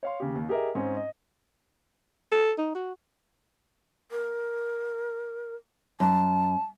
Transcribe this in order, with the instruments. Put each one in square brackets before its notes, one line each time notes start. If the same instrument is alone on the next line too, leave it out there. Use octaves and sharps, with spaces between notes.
[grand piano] C#5 F5 C6
D#2 C#3 G4
D#2
G4 G#4 A#4 D#5 E5
G#2 C4 C#4 D#5
D#5
[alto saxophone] A4
D#4
F#4
[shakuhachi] A#4
[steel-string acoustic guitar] F#2 [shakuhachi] A5